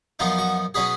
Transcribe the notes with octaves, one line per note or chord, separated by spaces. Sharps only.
F#2 F3 B3 D#4 F4
F#4
B2 F#3 C#4 G#4 B4